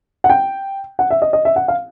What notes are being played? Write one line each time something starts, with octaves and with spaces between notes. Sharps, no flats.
F#5
G5
F#5
E5
D#5
D#5
E5
F#5
F5